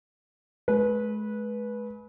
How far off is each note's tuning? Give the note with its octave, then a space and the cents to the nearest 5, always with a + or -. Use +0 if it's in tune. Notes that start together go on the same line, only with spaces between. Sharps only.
G#3 +40 B4 -15